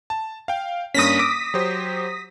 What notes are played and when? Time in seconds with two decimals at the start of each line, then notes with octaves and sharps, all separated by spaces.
0.10 A5
0.48 F5 G5
0.94 G2 A#3 C#4 D#6 A#6 B6
1.19 D6 E6 D7
1.54 F#3 G4 C5